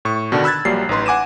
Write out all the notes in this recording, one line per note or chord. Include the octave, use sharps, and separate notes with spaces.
A2 C#6
B2 D3 D#3 D4 F#4
B5 E6 F#6 G#6 A6
A#1 A#2 F#3 G3 C7
A1 D#4 B4 C6
F#5 G#5 D6 D#7 E7